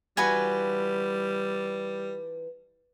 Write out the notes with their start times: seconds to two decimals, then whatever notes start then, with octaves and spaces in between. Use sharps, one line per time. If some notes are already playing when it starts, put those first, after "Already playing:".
0.17 E3 G3 D4 F4 F#4 B4 G#5